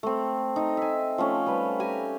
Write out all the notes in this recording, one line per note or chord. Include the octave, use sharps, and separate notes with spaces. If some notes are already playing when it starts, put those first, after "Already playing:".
A3 C4
D#4 A#5
E5 G#5
F3 A3 C#4
G3 B4
G4 G#5 A#5